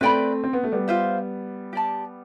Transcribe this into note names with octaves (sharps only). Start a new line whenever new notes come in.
A3 C4 B4 D5 G5 B5
C4
B3
A3
G3 B3
F4 C5 E5
G4 D5 A5